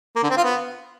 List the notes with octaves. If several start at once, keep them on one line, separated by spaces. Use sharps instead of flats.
A#3
D3
C4
F4
B3